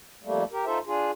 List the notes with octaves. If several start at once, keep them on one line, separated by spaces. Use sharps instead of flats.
F2 G3 A3 A#3
G4 A#4
D#4 F4 A4 C5 E5
D4 F4 G#4